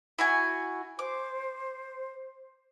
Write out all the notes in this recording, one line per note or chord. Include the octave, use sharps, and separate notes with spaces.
E4 F#4 G#5
C5 D6